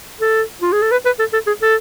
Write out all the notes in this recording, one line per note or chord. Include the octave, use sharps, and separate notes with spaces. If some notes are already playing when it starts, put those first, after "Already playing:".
A4
F4
G#4
A4
B4
B4
A4
A4
G#4
A4